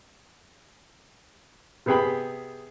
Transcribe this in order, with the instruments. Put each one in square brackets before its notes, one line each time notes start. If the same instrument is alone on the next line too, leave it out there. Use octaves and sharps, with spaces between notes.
[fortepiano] C3 B3 G#4 G5 B5